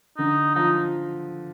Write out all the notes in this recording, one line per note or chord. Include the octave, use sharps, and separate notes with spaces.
D3 D#4
F3 D#4